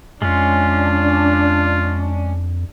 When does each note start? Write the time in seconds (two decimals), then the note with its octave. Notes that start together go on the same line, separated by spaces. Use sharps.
0.22 F2 G#3 C#4 D4 F4